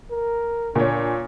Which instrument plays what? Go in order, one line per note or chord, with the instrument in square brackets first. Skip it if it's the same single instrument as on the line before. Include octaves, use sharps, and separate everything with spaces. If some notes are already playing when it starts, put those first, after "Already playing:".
[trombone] A#4
[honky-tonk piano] A#2 C#5 [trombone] D4